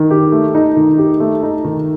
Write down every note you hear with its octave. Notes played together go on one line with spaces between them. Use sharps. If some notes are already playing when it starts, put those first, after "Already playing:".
Already playing: D#3
G4
A3
D#4
D#3
G4
A3
D#4
D#3